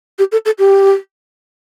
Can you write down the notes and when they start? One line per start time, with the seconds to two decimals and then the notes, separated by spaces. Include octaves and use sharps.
0.18 G4
0.32 A4
0.45 A4
0.58 G4